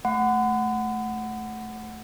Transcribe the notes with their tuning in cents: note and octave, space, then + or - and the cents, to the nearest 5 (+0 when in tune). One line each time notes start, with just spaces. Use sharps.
A3 -10 F#5 +0 B5 +45